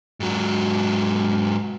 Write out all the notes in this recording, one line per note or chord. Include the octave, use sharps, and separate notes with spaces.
G#2 F#3